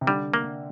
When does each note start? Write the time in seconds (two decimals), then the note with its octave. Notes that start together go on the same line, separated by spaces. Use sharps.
0.01 C3
0.07 D3 G3
0.34 A#3